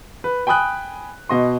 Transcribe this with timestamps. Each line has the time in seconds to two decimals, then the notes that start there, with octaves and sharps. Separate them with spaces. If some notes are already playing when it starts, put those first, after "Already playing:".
0.24 B4
0.47 G5 G#5 B5 D#6 F#6
1.29 B2 D#5 C6